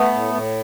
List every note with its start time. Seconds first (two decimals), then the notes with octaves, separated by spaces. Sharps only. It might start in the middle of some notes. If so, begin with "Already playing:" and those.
Already playing: A3 B3
0.13 A2
0.34 A2